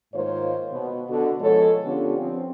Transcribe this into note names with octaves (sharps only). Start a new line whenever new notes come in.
G#2 D#3 A#3 F4 C5 C#5
B2 B3
B2 D3 F#4
F3 G#3 B3 A4 C#5
D3 B3 C#4 D4 F4 G4
F3 C4